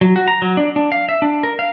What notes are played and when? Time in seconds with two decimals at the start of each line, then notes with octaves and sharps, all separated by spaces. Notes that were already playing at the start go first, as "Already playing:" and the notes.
0.01 F#3
0.16 F#4
0.28 A#5
0.42 F#3
0.57 D4
0.76 D4
0.92 F5
1.09 E5
1.22 D4
1.43 A#4
1.59 F5